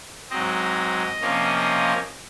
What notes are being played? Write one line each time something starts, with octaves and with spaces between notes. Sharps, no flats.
G#2 F#3 C4 D#5
C3 F3 A#3 C#4